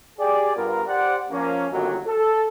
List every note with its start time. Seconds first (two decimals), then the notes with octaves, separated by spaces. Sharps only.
0.19 G4 G#4 D5
0.57 G2 B3 F4 A#4
0.87 G4 C5 D5 F#5
1.31 F3 A#3 C#4
1.72 G1 A#2 D#3 F#3
2.07 A4